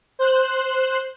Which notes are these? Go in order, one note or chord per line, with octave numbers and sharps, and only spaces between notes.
C5 F#6